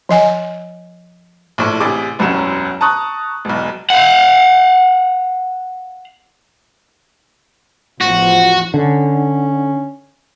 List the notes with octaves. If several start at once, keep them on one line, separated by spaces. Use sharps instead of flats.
F3 D#5 G#5
A#1 A2
A1 C3 G#4 D6
E1 C2 F#2 F#3 C#4 E7
A5 A#5 C#6 D#6 F#6
E1 B1
F5 F#5
A1 E2 F3 F#4
D3 C#4